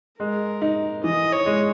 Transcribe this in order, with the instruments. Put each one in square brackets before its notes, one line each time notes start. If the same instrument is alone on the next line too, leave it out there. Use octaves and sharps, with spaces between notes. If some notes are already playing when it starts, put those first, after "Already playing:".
[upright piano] G#3 [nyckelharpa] A#4
[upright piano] D#4
[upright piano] E3 [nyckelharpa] D#5
[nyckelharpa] C#5
[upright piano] G#3